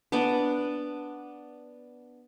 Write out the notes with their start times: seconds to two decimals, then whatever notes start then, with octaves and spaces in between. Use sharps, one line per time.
0.12 B3 D4 D6